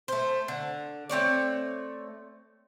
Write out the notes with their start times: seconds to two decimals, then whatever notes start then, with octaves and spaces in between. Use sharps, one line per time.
0.08 A3 C5
0.48 D3
1.09 A3 C4 C#5 D5